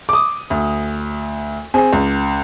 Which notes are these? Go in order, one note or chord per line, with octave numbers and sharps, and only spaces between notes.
D6 D#6
D2
C4 G#4
C#2